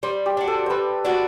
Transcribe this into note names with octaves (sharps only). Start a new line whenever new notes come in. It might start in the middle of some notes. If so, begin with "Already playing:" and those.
G3 C5
G4
D4 F#4
A4
G3 B4 C5
D4 F#4